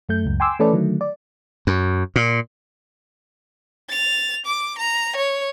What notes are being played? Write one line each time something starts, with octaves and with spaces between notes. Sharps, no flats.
F#2 A3 G6
C#2 F#2
G5 G#5 C6 D6 E6
E3 A3 C#4 A4 B4 D5
D3 D#3 F#3 A3
D5
F#2
A#2
A6 F7
D6
A#5
C#5